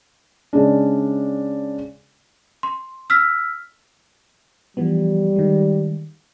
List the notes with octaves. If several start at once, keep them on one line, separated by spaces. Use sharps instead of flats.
C#3 G#3 D4
C6
E6 F6 B6
E3 F3 G3 B3
D#3 G#3